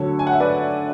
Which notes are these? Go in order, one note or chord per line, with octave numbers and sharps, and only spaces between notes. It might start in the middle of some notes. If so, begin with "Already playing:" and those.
Already playing: D2 D3 F#3 A4 C#5
G#5
F#5
E5
B4 D5